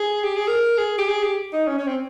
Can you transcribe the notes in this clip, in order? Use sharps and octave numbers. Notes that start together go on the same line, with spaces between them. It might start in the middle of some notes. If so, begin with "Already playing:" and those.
Already playing: G#4
G4
G#4
A#4
G#4
G4
G#4
G4
D#4
C#4
C#4
C4